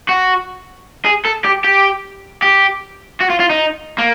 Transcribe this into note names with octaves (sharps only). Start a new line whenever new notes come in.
F#4
G#4
A4
G4
G4
G4
F#4
F4
F4
D#4
A#3